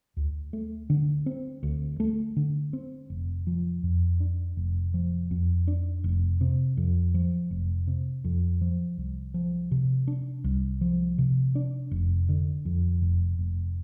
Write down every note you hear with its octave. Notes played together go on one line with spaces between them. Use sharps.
D2
A3
D3
C4
D2
A3
D3
C4
F1
F3
F2
D4
F1
F3
F2
D4
F1
C3
F2
F3
F1
C3
F2
F3
C2
F3
C3
D4
C2
F3
C3
D4
F1
D3
F2
F1
F1